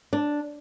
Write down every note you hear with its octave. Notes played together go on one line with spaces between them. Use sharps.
D4